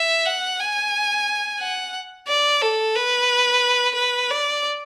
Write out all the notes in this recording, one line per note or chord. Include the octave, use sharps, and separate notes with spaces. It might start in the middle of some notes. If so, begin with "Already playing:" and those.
Already playing: E5
F#5
G#5
F#5
D5
A4
B4
B4
D5